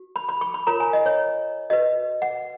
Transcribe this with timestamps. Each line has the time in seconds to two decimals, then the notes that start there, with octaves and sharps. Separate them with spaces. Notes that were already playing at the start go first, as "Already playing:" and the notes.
Already playing: F#4
0.16 B5
0.29 B5
0.41 C#6
0.54 B5
0.67 F4 A#4 C#5 A#5
0.80 G#5
0.93 D#5
1.06 C#5
1.70 F#4 B4 D#5
2.22 F#5